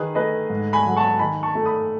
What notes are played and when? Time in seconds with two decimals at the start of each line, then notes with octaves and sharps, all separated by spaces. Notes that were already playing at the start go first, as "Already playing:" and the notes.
Already playing: D#3 G#4 B4
0.15 A3 B4 D#5
0.50 G#2
0.73 G#5 B5
0.86 F#3
0.96 A5 C#6
1.19 D#3 G#5 B5
1.43 A5 C#6
1.55 A3
1.66 B5 D#6